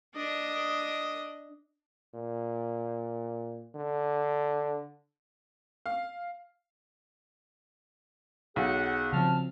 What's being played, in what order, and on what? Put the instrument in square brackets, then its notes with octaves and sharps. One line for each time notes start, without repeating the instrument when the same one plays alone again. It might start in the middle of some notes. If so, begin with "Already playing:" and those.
[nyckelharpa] D4 D#5
[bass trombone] A#2
D3
[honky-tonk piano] F5
[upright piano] B1 [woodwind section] G#4 F#5
[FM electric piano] C#3 F3 C4 [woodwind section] A5 F6